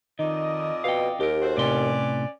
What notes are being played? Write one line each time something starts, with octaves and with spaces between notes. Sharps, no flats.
F2 D#3 D#4 D5 D#5
B2 F5 G5
D#2 G4 A#4
F#4 A4 C5
A2 C3 C#4 B4 D5 C6